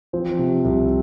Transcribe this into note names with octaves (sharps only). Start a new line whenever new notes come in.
F3 C4
C3
C2